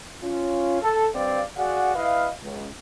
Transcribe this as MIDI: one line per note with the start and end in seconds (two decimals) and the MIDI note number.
0.23 0.81 61
0.23 0.81 65
0.81 1.06 69
1.14 1.41 43
1.14 1.41 60
1.14 1.41 74
1.14 1.41 77
1.56 1.92 66
1.56 1.92 68
1.56 1.92 74
1.56 1.92 77
1.56 1.92 78
1.95 2.28 64
1.95 2.28 71
1.95 2.28 75
1.95 2.28 77
2.42 2.66 37